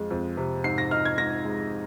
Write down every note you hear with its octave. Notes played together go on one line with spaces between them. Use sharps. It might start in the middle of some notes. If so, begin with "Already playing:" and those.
Already playing: F2 G#3
F2
C3
G#2 C7
A#6
D#4 F6
G#6
G#2 A#6
G#3